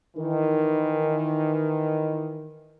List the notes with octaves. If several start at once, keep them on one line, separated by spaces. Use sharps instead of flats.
D#3 E3